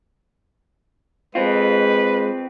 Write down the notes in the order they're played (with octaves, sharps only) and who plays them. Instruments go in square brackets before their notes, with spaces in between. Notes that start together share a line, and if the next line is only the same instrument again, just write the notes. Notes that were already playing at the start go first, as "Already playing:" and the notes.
[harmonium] G#3 [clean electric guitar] C4 F4 [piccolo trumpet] B4